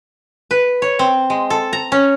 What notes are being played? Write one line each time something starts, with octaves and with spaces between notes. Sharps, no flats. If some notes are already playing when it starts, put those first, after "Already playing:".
B4
C#5
C4
G#3
A4
A#5
C#4